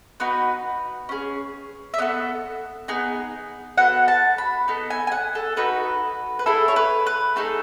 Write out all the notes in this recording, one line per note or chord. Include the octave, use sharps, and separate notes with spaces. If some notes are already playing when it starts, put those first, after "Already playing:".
B3 D#4 F#4 B4
C#4 E4 G#4
E5
B3 F#4 A4 D#5
B3 D#4 G#4
B3 F#4 A4 F#5
A5
B5
B3 D#4 A4
G#5
G#5
F#5
A4
D#4 F#4 A4 B4
B4
A3 E4 G#4 A4
C#5
B4
B4
A3 D#4 G#4 A4